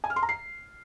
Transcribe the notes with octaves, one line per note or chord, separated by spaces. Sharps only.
G#5
F6
C6
A#5
C7